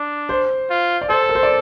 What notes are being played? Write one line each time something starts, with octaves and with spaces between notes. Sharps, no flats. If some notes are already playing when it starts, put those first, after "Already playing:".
Already playing: D4
C5
F4
D5
A4 C5
A#4
C5
D5